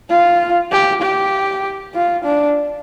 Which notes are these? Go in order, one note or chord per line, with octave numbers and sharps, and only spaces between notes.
F4
G4
G4
F4
D4